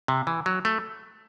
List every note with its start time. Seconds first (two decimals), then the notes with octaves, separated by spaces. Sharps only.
0.08 C3
0.27 E3
0.46 F#3
0.65 A3